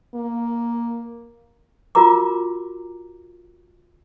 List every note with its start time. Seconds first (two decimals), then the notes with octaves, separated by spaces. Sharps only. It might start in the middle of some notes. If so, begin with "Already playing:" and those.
0.15 A#3
1.95 F4 F#4 A#4 A#5 D6